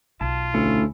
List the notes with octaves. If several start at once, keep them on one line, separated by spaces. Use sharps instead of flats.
B1 F4 A5
D2 A3 C#4 E4